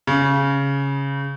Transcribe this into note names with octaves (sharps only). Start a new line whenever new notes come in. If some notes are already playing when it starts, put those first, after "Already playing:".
C#3